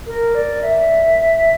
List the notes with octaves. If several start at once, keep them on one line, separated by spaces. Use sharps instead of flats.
A#4
D5
E5